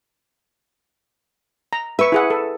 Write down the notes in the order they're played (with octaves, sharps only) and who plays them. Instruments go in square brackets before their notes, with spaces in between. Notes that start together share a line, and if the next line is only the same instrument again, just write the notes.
[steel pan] A#5
[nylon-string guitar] B4 [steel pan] E5 C#6
[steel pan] E4 G#4 F#5
A4